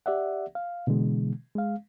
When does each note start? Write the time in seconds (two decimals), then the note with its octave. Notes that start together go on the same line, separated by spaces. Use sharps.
0.06 G4 D5 E5 F#5
0.55 F5
0.87 B2 D3 E3 G#3
1.55 G#3 F5